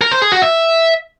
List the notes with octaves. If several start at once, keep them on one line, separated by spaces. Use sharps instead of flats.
A#4
C5
G#4
F#4
E5